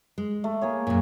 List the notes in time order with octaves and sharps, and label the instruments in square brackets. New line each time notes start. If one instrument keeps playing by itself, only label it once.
[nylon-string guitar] G#3
[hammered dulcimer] A3
A#3 G#4 C#5
[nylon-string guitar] F#2 A#2